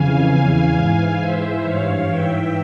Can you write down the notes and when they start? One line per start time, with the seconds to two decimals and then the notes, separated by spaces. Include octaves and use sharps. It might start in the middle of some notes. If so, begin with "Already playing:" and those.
Already playing: F2 C#3 E3 F5 G#5
0.30 E2 C#3 E3
0.74 G#2 E3 F5 G#5
1.19 G#2 E3 C5 E5
1.63 G2 E3 C#5 F5
2.07 G#2 E3 E5 G5